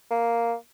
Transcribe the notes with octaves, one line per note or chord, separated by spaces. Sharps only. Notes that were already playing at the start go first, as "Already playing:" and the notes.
A#3